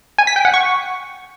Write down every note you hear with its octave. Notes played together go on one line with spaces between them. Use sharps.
G#5
B6
G5
F#5
C#6